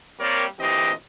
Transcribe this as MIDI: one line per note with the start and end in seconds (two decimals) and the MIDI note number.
0.19 0.45 55
0.19 0.45 58
0.19 0.45 60
0.19 0.45 70
0.19 0.45 73
0.19 0.45 74
0.58 0.90 38
0.58 0.90 46
0.58 0.90 52
0.58 0.90 60
0.58 0.90 67
0.58 0.90 75